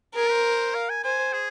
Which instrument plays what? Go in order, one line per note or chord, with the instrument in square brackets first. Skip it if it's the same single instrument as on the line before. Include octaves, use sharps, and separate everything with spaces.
[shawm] G#4 [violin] A#4
[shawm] C5
F5
G#5
[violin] C5 [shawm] G#5
[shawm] G#4